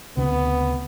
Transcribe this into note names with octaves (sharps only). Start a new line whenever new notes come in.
D2 C#3 B3 C4